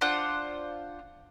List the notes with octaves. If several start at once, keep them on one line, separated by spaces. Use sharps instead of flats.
D4 F4 C5 F#5